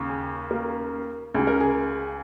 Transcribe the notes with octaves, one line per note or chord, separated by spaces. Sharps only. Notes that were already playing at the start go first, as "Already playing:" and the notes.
Already playing: D#2 C#3
G#4
A#3 A#4
C#2 C#3 G#4
A#4
G#4